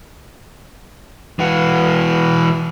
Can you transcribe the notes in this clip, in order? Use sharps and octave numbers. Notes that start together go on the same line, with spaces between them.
E3 F#4